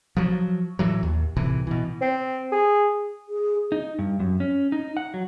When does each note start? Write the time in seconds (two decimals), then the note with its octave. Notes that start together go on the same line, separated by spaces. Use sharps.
0.17 F3 F#3
0.79 A2 E3 F#3
1.03 D#2
1.37 C2 A2 C3 E3
1.67 B2 E3
2.01 C4
2.52 G#4
3.29 G#4
3.72 D#4
3.99 G2
4.20 F#2
4.40 C#4
4.72 D#4
4.97 F#5
5.14 F#3